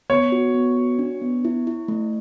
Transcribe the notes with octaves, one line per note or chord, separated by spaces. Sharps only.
B3 C#5
F#4
B3
F#4
D4
B3
E4
E4
A3